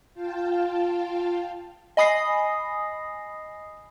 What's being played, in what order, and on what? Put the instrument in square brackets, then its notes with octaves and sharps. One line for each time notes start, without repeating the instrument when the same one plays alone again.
[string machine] F4 F5 G5 A5
[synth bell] D#5 G#5 B5 D#6 A#6 C7